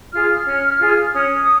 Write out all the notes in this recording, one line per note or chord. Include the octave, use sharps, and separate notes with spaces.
F4 G#4 F6
C#4
F4 G#4
C#4 D#6